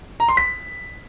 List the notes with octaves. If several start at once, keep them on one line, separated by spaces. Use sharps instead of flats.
A#5
C6
B6